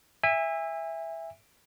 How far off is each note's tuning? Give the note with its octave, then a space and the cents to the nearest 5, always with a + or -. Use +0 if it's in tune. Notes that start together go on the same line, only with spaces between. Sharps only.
E5 +0 G#5 -35